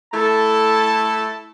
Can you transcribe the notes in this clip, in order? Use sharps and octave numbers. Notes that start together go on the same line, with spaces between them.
A3 E4 A4 A5